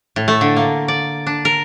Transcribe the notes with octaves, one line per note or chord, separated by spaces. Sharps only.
A2
A3
D3
A#3
D5
D4
A#4